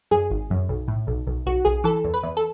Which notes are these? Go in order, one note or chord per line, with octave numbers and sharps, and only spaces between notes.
F#2 G#4
G#1
F#2
B1
A2
B1
B1
B1 F#4
B1 G#4
E3 A4
E2
B4
E2
A4